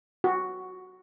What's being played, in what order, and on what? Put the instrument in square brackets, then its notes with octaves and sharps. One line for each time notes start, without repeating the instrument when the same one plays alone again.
[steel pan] F#4